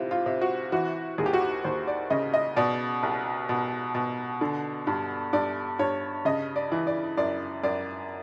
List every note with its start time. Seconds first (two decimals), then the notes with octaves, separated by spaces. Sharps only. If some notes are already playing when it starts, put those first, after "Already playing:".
Already playing: C3 E3 F4
0.11 F4
0.26 C3
0.41 F#4
0.72 E3 F#4
1.18 D#2 G#4
1.26 G4
1.33 F#4
1.41 G4
1.64 D#2 C5
1.87 D5
2.10 C#3 D#5
2.34 D#5
2.56 B2 D5
3.03 C2
3.49 B2
3.95 B2
4.41 D3
4.87 G2
5.33 G2 D5
5.79 G2 C#5
6.25 C#3 D#5
6.56 D5
6.72 E3
6.87 D5
7.17 F#2 D5
7.63 F#2 D5